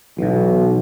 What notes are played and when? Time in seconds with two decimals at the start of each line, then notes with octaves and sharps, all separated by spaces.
0.18 B1 B2 E3